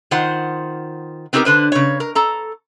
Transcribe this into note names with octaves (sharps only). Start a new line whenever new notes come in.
D#3 F4 C5 F#5
B3 C4 D#4 G4 G#4 A#4
D3 B4 C5
C#3 C#5
A#4
A4 A#5